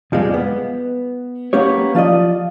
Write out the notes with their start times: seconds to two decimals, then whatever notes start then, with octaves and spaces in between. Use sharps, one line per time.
0.12 F2 F3 G3 G#3
0.34 B3
1.53 A#3 B3 C#4 G4 C#5
1.95 F3 F4 D5 D#5